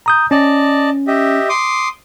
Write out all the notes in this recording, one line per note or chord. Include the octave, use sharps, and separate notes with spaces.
A#5 D#6 G6
C#4 D5 D#5 A5
G4 D#5 E5
C6 D6 D#6